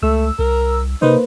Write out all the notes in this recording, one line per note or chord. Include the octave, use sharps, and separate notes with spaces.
C#2 A3 E6
C2 A#4
C3 A#3 D#4 B4 C5